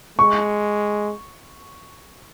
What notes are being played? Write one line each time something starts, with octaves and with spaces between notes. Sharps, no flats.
G#3 C#6